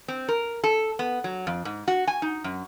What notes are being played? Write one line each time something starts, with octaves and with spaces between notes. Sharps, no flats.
C4
A#4
A4
B3
F#3
F2
G#2
F#4
G#5
D#4
F#2